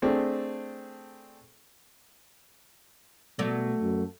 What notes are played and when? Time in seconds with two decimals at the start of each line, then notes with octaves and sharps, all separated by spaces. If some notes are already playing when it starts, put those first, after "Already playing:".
0.02 A3 C4 D4 G#4
3.39 B2 F#3 A3 D5
3.82 F#2